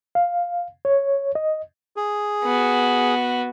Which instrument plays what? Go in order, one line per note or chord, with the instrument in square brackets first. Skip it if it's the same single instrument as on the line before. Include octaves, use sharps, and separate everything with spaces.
[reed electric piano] F5
C#5
D#5
[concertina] G#4
[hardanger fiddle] B3 F#4